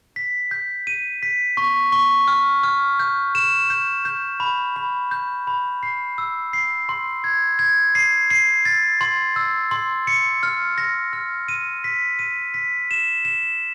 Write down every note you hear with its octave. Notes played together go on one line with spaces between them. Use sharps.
B6
G6
D#7
B6
C#6
C#6
F6
F6
G6
E7
G6
G6
B5
B5
G6
B5
C7
E6
C7
C6
G#6
G#6
C7
C7
A6
C6
E6
C6
C#7
F6
A#6
F6
D#7
B6
D#7
B6
E7
E7